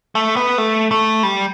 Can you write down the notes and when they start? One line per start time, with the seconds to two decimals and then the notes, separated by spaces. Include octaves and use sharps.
0.15 A3
0.36 B3
0.58 A3
0.91 A3
1.23 G3